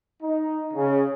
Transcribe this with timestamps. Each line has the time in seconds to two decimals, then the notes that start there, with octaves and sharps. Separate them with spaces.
0.22 D#4
0.73 C#3